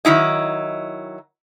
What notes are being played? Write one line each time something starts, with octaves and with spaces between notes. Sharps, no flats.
D#3 F#3 E4 D#5